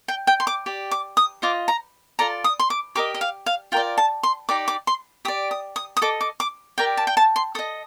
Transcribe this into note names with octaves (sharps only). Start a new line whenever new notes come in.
G5
G5
C6
D6
G4 D5
D6
D#6
F4 C5 D#5 D6
A#5
F4 A4 D5 A#5
D#6
C6
D6
G4 A#4 D#5 D6
D#5
F5
F5
F4 A#4 D5 G5
A5
C6
D#4 G4 D5 D6
D6
C6
G4 D5 D#6
D#6
D#6
D#6
A4 D#5 D6
D6
D6
G4 A#4 D5 G5
A5
G5
A5
C6
A4 D#5 D#6